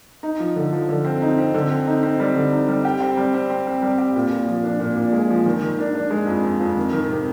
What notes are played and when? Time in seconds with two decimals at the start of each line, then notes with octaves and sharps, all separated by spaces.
0.23 D#4
0.40 F3
0.56 D3
0.72 F3
0.89 D3
1.05 C4
1.22 D#4
1.38 C4
1.54 D3
1.70 C4
1.87 D#4
2.03 C4
2.20 G3
2.36 D3
2.53 D#4
2.68 G3
2.85 G4
3.00 C4
3.17 G3
3.34 C4
3.50 C4
3.67 C4
3.82 G3
3.98 G4
4.16 A#2
4.31 A#2
4.48 F3
4.64 D4
4.80 A#2
4.97 A#2
5.12 G#3
5.30 F3
5.46 D#3
5.62 D#3
5.78 D4
5.95 D4
6.10 G#3
6.27 F2
6.44 F2
6.60 F2
6.77 D#3
6.93 D#3
7.09 C3